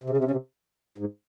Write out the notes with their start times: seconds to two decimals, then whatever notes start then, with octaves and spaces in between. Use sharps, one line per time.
0.04 C3
0.10 C#3
0.17 C3
0.24 C#3
0.31 C3
0.98 G#2